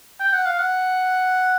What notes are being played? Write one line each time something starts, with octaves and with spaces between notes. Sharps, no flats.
G5
F#5
F5
F#5